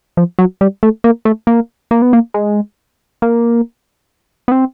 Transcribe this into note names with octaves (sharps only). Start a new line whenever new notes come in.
F3
F#3
G3
A3
A#3
A3
A#3
A#3
B3
A#3
G#3
A#3
B3
C4